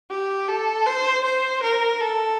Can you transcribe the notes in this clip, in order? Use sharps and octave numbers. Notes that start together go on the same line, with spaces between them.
G4
A4
C5
C5
A#4
A4